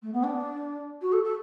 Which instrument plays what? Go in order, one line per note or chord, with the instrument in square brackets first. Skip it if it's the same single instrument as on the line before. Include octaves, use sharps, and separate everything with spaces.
[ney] A3
B3
D4
F#4
A4
A4